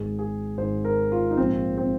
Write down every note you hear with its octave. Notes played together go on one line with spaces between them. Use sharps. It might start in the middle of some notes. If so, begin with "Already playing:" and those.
Already playing: G#1 G#2 G#3 G#4
G#4
G#1 G#2 G#3 C5
A#4
F4
D#4
A#1 G#2 F3 A#3 C4
C4